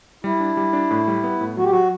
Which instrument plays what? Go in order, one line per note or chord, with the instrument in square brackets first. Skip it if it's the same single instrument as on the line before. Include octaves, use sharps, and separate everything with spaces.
[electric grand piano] G3 [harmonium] E4
[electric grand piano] D4
G3
D4
A2
G3
B3
A2
[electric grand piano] F#3 [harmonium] F#4
[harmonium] G4
[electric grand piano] F#3 [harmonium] F#4